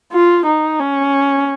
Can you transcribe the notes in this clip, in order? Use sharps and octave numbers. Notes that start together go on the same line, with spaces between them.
F4
D#4
C#4